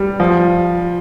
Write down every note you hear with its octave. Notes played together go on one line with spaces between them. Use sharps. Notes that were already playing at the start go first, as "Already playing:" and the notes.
Already playing: G3
F3